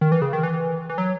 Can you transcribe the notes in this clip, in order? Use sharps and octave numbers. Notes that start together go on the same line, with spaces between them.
D#3
E3
C#3
D#3
E3
E3
F#3